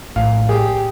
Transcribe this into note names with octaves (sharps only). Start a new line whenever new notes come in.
A#1 A2 F5
G4 G#4